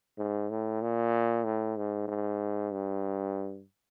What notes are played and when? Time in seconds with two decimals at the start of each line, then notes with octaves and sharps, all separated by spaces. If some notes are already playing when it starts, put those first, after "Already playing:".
0.18 G#2
0.50 A2
0.82 A#2
1.44 A2
1.77 G#2
2.08 G#2
2.72 G2